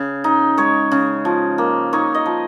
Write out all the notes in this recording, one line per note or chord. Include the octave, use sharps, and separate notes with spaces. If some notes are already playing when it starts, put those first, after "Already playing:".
Already playing: C#3
D#4
G#3 C#5
C#3
F3
A#3
D#4 C#5
D#5
F3